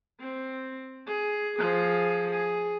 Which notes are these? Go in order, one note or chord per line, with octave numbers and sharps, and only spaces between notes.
C4
G#4
F3 G#4
G#4